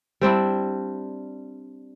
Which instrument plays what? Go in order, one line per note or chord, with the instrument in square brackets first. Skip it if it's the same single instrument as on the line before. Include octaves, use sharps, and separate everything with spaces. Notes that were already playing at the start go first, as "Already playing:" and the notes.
[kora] G3 C4 D4 E4